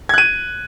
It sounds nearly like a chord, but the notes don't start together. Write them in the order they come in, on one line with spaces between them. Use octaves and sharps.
G#6 F#6 D#7